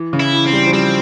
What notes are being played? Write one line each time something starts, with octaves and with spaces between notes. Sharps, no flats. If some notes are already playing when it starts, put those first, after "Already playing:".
Already playing: E3
C#3
E4
E3
C4
G3
F3
G3 C4